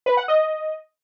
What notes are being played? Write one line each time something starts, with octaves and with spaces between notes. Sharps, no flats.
B4
F#5
D#5